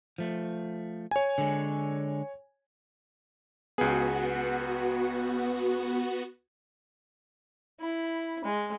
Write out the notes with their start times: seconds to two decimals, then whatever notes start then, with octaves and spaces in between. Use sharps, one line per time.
0.18 F3 A3
1.11 C#5 G#5
1.38 D3 G#3
3.78 C#2 B3 F#4 G#4
7.80 E4
8.44 G#3